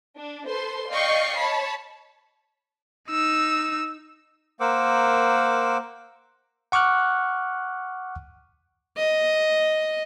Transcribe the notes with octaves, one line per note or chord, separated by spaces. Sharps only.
D4
A4 B4 C5 C6
D5 D#5 F5 G5 C#6 C7
C#5 A5 B5
D#4 E6
A#3 A#4 C5 F#5 D6 E6
F#5 C#6 D6 F6 F#6
D#5